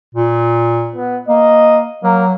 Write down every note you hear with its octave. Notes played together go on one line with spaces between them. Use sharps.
A#2
B3
A#3 D#5
F#3 A#3